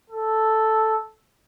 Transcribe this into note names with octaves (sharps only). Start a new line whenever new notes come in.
A4